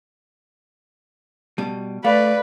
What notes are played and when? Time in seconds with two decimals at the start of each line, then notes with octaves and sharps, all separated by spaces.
1.58 B2 G3 A5
2.04 A3 B4 D5 F5